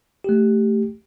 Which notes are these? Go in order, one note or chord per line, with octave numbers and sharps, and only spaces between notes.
A3 G4